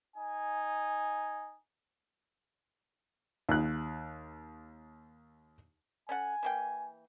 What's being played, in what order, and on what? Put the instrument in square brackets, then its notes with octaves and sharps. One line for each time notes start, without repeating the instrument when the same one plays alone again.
[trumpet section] D#4 G#5
[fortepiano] D#2 F#6
[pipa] C#4 A4 F#5 [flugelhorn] G#5
[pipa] E3 A#3 G5